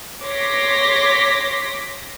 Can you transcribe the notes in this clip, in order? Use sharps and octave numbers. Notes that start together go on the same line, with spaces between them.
C#5 C6 D6 A#6 B6